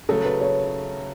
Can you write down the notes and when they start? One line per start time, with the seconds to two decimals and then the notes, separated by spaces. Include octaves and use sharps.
0.09 C#3 F#3 A3 A4
0.25 B4
0.41 C#5